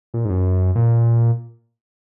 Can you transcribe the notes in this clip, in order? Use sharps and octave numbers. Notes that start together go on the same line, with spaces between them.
A#2
G#2
F#2
A#2